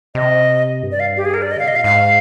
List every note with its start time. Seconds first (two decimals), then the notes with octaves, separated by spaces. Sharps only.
0.15 C3 D#5
0.83 G2
0.92 D5
1.00 F5
1.17 G4
1.25 G#4
1.34 A#4
1.42 D5
1.51 D#5
1.56 D3
1.59 F5
1.62 C3
1.68 D#5
1.73 A#2 F5
1.84 G#2 F5